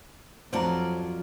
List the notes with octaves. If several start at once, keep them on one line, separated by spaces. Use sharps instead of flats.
F2 F#3 F4 C5 D5 A5 A#5